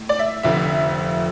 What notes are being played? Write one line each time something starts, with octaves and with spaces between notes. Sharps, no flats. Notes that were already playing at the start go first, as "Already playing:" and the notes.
Already playing: A2
D5
E5
F1 F2 D3 F3 E5